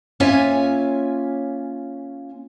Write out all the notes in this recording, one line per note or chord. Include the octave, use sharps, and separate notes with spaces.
A#3 C#4 F4 C#5 E5 G#5